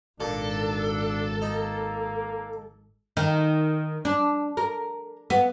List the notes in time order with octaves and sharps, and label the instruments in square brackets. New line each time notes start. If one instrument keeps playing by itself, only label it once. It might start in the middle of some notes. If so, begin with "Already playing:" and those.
[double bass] G#1 [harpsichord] A#2 [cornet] D4 [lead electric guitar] A4
[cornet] A#3 [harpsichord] D#4
[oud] D#3
D4
A#4
B3